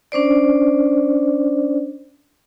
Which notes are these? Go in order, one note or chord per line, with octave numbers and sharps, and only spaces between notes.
C#4 D4 C5 D5